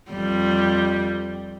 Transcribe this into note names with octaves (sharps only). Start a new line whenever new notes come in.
F2 G3